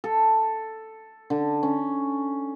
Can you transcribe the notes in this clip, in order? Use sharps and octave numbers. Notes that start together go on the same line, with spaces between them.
A4
D3
C#4